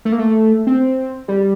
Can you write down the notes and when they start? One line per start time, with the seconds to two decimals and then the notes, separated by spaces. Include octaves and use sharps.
0.05 A3
0.12 A#3
0.19 A3
0.67 C4
1.28 G3